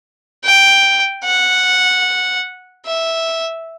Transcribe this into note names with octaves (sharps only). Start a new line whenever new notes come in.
G5
F#5
E5